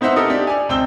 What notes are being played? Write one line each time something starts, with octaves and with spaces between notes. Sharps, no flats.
B3 D#4 C5 E5 F#5
D#4 G4 A4 A#4 D#5
D4 G4
D5 G#5
C#2 C4 G5 E6 G7